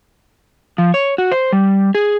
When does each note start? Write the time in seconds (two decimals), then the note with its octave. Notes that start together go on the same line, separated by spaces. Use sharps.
0.78 F3
0.94 C#5
1.18 F#4
1.32 C5
1.52 G3
1.95 G#4